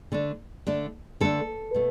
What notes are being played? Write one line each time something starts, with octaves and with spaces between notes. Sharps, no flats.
D3 A3 D4
D3 A3 D4
D3 A3 D4 A4
B2 A3